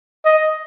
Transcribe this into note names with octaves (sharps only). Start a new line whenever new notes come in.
D#5